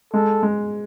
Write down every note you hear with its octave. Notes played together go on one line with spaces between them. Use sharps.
G#3 A4
G#3